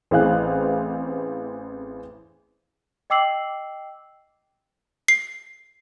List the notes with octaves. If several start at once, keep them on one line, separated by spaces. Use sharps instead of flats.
A1 E3 C4 G#4 F5 F#6
D#5 G5 D6 E6 C7 F#7
C7